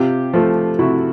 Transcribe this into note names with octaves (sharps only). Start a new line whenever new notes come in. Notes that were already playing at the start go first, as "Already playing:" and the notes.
Already playing: C3 F4 G4
F3 A3
C3 E4 F#4